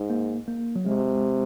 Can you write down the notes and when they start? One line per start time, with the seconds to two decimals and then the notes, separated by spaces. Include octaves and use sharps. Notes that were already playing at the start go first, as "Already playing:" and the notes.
Already playing: G#2
0.10 A#3
0.48 A#3
0.76 F#3
0.86 C3 G#3